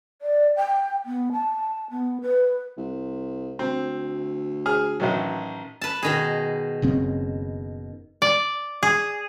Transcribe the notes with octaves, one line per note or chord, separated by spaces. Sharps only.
D5
G5
B3
A5
B3
B4
C2
D2 C4
G#4 F6
A1 D#3 F#3
B4 A5
B2 D#3 G#4
F#1 C#3 C4
D5
G#4